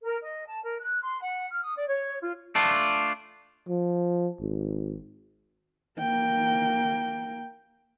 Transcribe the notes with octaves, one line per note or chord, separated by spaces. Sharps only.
A#4
D#5
A5
A#4
F#6
C6
F#5
F6
D#6
D5
C#5
F4
A3 D4 F4
F3
G#1
A#3 G5